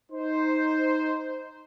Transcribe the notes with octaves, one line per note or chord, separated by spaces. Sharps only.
D#4 C5